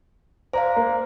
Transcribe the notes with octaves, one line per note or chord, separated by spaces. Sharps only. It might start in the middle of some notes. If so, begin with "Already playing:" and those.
C5 D5 F5 A#5
A#3